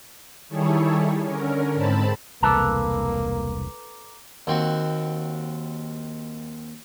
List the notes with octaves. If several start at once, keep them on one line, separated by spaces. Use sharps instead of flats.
D#3 G3 E4 G#4 A4 C#5
D3 C#4 A#4
G#2 C4 A5 B5
E1 C2 A#3 A4 B4 A5 A#5 D6
D#2 C4 F#4